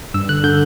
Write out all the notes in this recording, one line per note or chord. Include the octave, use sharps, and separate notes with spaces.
G2 E6
D3 F#6
D3 G6